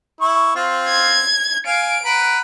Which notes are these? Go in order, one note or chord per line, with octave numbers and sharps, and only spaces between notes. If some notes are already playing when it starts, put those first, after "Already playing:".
E4 C#6
C4 F4
G#6
F5 G#5 D7
B4 F#5 A#5